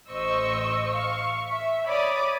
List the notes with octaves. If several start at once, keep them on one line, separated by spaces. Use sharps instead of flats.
A1 C5 D#5 C#6 E6
F5 C#6
E5
C#5 D5 B5 D6 D#6